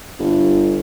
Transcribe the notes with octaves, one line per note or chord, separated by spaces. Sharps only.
G1